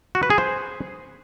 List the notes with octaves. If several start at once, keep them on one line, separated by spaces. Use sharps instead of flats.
F#4
B4
G#4
C5